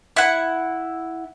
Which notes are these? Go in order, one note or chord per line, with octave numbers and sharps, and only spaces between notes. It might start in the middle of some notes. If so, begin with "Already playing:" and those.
E4 F#5